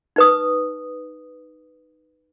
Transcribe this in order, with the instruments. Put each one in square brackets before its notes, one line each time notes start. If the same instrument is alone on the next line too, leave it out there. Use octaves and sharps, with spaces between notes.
[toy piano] D#4 B4 D#6